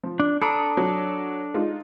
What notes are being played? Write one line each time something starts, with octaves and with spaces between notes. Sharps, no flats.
F3
D4
D4 A4 A#5 B5 D#6
F#3
G#3 D#4 F4